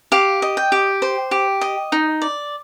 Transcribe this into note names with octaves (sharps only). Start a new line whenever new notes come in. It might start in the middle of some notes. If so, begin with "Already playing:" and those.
G4 F5
D#5
G5
G4
C5
G4
D#5
D#4
D5